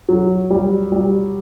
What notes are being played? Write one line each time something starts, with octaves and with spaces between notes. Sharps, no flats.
F#3
G3
G3